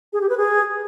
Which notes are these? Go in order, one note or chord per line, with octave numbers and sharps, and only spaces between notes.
G#4
G4
B4
G#4